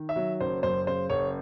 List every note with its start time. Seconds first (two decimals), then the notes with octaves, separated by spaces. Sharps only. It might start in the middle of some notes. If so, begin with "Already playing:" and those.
Already playing: D#3
0.09 E5
0.16 F#3
0.40 F#1 C5
0.63 F#2 C5
0.87 C#3 C5
1.10 F#1 C#5